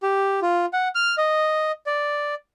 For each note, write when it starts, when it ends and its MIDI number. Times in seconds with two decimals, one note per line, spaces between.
0.03 0.40 67
0.42 0.66 65
0.73 0.88 78
0.95 1.15 89
1.18 1.72 75
1.86 2.35 74